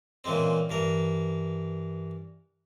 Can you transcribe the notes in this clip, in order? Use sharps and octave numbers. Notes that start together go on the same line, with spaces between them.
A#2 C#3 E3 G#3 C4
G2 E3 A#4